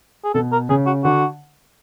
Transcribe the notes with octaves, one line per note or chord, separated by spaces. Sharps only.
G#4
B2 A4
A#4
C#3 G#4
F#4
D3 F#4